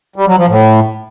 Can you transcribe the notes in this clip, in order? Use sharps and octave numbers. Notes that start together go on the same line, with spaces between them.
G3
F#3
F3
A2